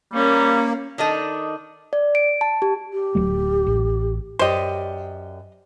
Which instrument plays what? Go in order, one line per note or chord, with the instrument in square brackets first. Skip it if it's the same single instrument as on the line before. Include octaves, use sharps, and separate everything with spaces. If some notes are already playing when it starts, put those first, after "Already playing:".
[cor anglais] G3 [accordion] A#3 [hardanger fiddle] C#4
[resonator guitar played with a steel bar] D#3 D4 D#4 A4 D#5
[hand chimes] D5
D7
A5
G4
[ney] G4
[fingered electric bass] D1 F#3 A3
A1
[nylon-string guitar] F#2 G4 D5 [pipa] C5 D#5